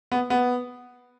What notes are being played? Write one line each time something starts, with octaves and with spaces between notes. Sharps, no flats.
B3
B3